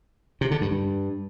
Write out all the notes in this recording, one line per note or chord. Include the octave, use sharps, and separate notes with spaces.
C3
D3
G2
G2